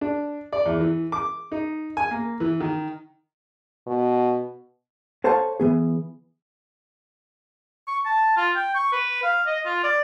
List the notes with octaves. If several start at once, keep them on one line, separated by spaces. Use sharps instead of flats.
D4
D5
E2
E3
D6
D#4
G#5
A#3
E3
D#3
B2
A4 C5 C#5 F5 F#5 A5
E3 B3 G#4
C#6
A5
F4
G5
C#6
B4
F5
D#5
F4
D5